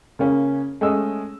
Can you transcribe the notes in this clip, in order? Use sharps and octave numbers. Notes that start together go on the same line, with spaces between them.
C#3 A#3 C#4
G#3 A3 C#4 D#5 E6